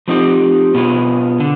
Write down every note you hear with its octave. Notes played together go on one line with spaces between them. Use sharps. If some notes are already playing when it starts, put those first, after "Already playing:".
F3 C4 D#4 G4
B2 B3 F4 G#4
D3